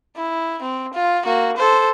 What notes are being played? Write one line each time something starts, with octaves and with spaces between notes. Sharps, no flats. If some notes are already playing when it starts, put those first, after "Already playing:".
E4
C4
F4
A#3 F#4
A4 C5